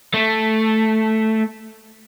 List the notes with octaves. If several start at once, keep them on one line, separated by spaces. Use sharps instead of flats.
A3